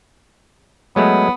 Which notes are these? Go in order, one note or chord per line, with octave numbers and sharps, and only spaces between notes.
F#3 G#3 A3 B3